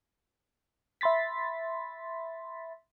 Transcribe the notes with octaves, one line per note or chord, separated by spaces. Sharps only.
E5 B5 C6 A6 B6